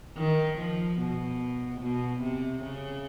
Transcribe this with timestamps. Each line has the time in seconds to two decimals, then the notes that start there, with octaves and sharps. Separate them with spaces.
0.17 D#3
0.58 F3
0.99 B2
1.81 B2
2.22 C3
2.63 C#3